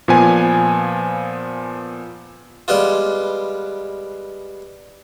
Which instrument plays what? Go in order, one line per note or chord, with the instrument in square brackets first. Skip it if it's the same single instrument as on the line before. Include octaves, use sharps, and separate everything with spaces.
[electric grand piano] A#2 F3 B3 G#5
[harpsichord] G3 G#3 B3 F4